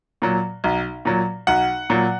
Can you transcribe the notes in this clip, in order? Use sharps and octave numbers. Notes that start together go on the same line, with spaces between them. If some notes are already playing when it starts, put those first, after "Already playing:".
A#2 F#3
B1
A#2 F#3
B1 F#5
A#2 F#3